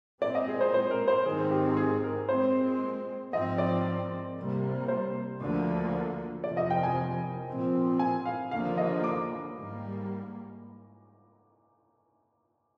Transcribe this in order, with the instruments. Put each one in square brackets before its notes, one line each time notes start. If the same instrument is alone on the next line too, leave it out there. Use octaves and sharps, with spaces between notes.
[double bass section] A#2 G#3 C4 [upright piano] D5
[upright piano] D#5
G#4
C5
C5
A#4
C5
[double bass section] G#2 D#3 G#3 C4 [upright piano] G#4
[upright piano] G4
G#4
A#4
[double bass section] A#2 G#3 C4 [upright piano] C5
[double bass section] G#2 F3 C4 [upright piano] D#5
[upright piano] D5
[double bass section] C2 C3 G3 A#3
[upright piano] C5
[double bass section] D2 D3 F3 A#3
[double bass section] F2 C3 F3 [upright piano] D5
[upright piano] D#5
G5
G#5
[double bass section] A#2 F3 C4
[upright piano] G#5
F5
[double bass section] D#2 D3 F3 A#3 [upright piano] F5
[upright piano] D#5
D6
[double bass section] G#2 G3 A#3